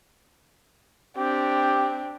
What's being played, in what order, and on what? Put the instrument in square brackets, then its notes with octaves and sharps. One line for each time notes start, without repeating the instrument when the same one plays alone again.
[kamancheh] C4 D4 [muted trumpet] G4